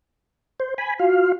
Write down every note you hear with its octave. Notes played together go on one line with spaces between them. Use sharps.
C5
G#5 B5
F4 F#4 F5